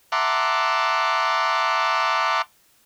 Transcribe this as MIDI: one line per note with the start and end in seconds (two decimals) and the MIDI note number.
0.12 2.42 76
0.12 2.42 78
0.12 2.42 81
0.12 2.42 82
0.12 2.42 84
0.12 2.42 86